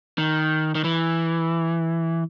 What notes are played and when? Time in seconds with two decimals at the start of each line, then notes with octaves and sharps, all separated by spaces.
0.18 D#3
0.75 D#3
0.84 E3